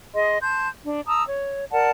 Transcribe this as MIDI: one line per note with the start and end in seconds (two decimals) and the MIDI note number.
0.15 0.38 68
0.15 0.38 75
0.15 0.38 84
0.41 0.69 81
0.41 0.69 84
0.41 0.69 91
0.84 1.00 62
1.07 1.23 81
1.07 1.23 82
1.07 1.23 87
1.07 1.23 88
1.26 1.64 73
1.72 1.91 70
1.72 1.91 74
1.72 1.91 78
1.72 1.91 81